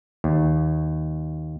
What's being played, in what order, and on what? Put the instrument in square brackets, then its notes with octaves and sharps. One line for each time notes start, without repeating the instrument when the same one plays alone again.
[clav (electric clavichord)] D#2